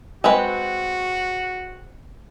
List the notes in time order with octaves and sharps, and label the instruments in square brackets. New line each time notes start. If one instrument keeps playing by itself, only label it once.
[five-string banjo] G#3 C4 B4 [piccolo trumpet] F#4